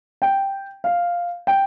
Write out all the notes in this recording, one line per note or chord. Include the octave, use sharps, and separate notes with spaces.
G5
F5
G5